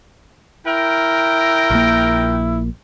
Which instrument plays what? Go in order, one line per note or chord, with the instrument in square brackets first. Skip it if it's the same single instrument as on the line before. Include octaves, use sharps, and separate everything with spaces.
[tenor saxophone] E4 [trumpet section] A#4 G5
[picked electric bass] A#1 A#3